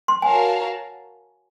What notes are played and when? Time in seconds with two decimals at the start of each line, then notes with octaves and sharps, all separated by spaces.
0.08 C6
0.22 F#4 A#4 C#5 F5 G#5 A5